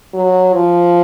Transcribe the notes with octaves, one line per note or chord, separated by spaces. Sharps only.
F#3
F3